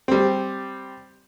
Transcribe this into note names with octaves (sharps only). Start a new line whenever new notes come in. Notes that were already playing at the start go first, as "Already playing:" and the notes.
G3 C4